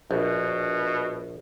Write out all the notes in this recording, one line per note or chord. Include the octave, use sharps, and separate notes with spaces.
A#1 B2